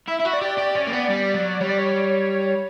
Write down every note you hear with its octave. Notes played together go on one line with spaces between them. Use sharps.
E4 E5
E4
F#4
D5
G4
G4 D5
C#4
A#3
B3
G3
F#3
G3 C#5
D5
C#5